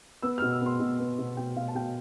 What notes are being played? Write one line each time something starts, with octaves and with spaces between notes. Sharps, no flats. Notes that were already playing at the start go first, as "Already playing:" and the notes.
B3 E6
F6
B2
E6
B3 C6
B2
B3
B2
B2 G5
B2 F5
A5
B2 G5